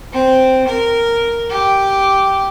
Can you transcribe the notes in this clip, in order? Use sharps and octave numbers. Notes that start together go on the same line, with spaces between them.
C4
A#4
G4